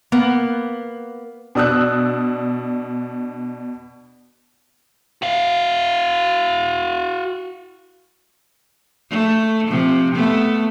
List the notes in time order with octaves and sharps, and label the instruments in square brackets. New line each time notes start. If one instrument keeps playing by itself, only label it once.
[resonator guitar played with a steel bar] A#3 B3
[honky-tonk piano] B2 D4 D#6 E6 F#6
[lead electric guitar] F#4 F5
[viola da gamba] A3
C3 F3
A3 B3